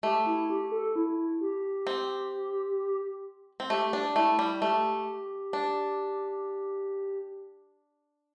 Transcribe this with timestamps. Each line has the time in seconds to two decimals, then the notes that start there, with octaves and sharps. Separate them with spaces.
0.03 A3 G4
0.26 E4
0.50 G4
0.72 A4
0.96 E4
1.41 G4
1.87 C4
3.60 C4
3.70 A3 G4
3.93 D4
4.16 A3 E4
4.39 G3
4.62 A3 G4
5.53 D4